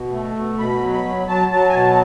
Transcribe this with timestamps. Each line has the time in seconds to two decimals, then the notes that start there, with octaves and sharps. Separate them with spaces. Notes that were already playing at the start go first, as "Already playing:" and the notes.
Already playing: B2
0.12 A3
0.36 B2
0.59 B2 B5
0.82 F#3
0.93 B5
1.05 F#3
1.28 F#3 A5
1.51 F#3 A5
1.69 G#5
1.74 B2 A5